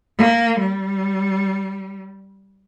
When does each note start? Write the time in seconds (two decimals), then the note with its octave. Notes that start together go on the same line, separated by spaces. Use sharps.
0.18 A#3
0.58 G3